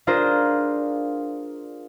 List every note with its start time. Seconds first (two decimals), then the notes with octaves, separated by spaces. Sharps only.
0.07 D4 F4 G#4 A#4 C5 D5